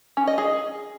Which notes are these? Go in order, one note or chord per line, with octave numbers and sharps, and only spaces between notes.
C#4
D#5
G#4